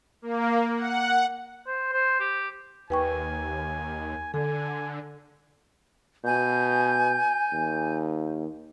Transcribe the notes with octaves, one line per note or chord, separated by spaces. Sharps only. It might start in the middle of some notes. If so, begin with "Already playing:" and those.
A#3
F#5
C5
C5
G4
D#2 B4 G5 G#5 C#6
D3 A4 G#5
B2 G#5 G6
D#2